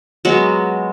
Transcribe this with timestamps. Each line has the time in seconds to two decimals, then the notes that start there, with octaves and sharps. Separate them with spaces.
0.25 F#3 G#3 B3